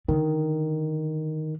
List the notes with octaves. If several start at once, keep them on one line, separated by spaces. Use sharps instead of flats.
D3 D#3